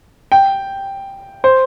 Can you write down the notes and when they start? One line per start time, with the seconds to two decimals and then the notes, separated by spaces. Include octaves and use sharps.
0.32 G5
1.44 C5